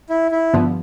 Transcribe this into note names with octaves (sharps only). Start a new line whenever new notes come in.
E4
E4
G2 D3 F3 B3